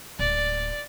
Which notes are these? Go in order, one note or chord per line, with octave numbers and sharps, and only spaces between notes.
D1 G#3 D5